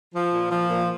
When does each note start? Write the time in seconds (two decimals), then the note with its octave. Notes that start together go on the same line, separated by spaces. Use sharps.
0.14 F3
0.32 A#2
0.51 F3
0.69 A#2